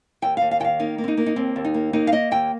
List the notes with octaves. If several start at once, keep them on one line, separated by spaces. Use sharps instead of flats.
D#2 G5
D#2 F5
F5
D#3 F5 G5
A#3 D#4
A#3
C4
D#4
A#3
D#4
D#2 C4
D#2
D#4
A#3
A#3 D#4
F5
A#3 D#5
D#2 G5